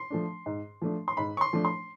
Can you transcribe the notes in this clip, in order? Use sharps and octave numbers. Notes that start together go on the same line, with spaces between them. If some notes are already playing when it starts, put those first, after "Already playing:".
Already playing: C6
F3 A3 D4
G#2
F3 A3 D4
C6
G#2 B5
C#6
C6
F3 A3 D4
C6